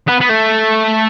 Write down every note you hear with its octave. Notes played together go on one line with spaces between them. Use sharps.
B3
B3
A3